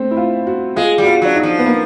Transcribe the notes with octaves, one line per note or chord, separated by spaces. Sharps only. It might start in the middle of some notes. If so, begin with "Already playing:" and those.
Already playing: A3 C4
E4
F4
F#4
G#3 F4
G3 F#4
F4
F#3 D4
D#4
F3
B3
A#3